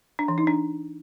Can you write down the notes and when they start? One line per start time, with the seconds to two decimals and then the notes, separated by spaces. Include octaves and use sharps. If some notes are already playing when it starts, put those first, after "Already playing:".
0.19 D4
0.28 E3
0.38 D#4
0.47 D4